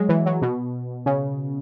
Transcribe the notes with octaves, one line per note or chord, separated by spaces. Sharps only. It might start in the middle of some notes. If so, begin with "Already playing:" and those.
Already playing: F#3 G#3
E3
F#3
B2
C#3